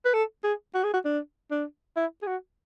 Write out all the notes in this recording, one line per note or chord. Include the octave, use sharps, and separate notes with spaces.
B4
A4
G#4
F#4
G#4
F#4
D4
D4
E4
G#4
F#4